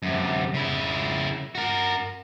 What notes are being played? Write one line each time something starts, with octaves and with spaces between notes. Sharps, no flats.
F#2 C3
C#3 E4
F#4 A#4